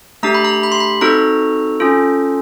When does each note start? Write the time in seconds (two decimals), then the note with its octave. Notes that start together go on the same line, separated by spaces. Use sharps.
0.23 A3 D4 G4 A#5
0.34 B5
0.45 A#5
0.63 B5
0.72 C6
0.80 B5
1.01 C4 D#4 F#4 A4 A#5
1.80 C#4 F4 A4